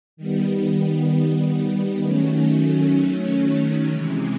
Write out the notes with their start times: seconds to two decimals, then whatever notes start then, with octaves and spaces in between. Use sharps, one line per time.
0.17 D#3 G3 B3
2.03 D#3 F#3 A3 C#4
3.90 C3 E3 G#3